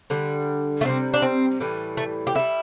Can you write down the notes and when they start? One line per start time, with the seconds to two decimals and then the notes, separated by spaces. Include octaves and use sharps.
0.10 D3 G3
0.81 A3
0.85 C3 E3 G3 C4
1.14 D4
1.22 C4
1.60 A2 E3 G3
1.97 A3
2.27 G4
2.35 D3 G3 E4